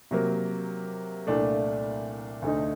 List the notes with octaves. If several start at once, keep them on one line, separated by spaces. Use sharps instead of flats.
C3 F#3 A#3
C2 A#2 A3 D4
D2 D3 A3 D#4